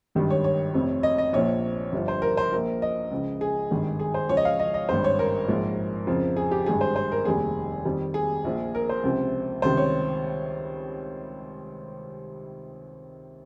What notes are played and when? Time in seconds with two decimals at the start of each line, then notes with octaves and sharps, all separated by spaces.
0.15 G#1 G2 D#3 G3
0.30 C#5
0.44 C#5
0.74 F1 F2 C3
1.03 D#5
1.18 D#5
1.33 A#1 A#2 F3 C#5
1.92 G1 G2 F3
2.08 C5
2.22 A#4
2.37 C5
2.53 A#1 A#2 F3 A#4
2.82 D#5
3.11 C#2 C#3 F3
3.41 G#4
3.71 G#1 G2 D#3 G3
3.99 G#4
4.14 C5
4.29 C#2 C#3 F3 C#5
4.37 D#5
4.45 F5
4.60 D#5
4.74 D#5
4.89 G#1 G2 G3 C5
5.04 C#5
5.19 A#4
5.48 A#1 G#2 F3
6.07 F2 C#3 F3
6.37 G#4
6.51 G4
6.66 G#1 G2 G3 G#4
6.81 C5
6.96 C5
7.12 A#4
7.25 F1 D#2 D#3 G3 G#4
7.85 F2 D#3 G3
8.14 G#4
8.44 A#1 A#2 F3
8.75 A#4
8.89 C5
9.04 C#2 C3 F3
9.62 C#2 C3 D#3 G3 C5
9.77 C#5